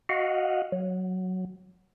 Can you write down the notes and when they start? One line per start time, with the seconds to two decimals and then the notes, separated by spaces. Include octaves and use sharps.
0.09 F#4 D#5 F5 F#5
0.72 F#3